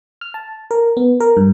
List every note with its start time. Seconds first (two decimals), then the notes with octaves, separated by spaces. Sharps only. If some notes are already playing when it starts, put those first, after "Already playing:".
0.21 F6
0.34 A5
0.71 A#4
0.97 B3
1.20 A#4
1.37 G2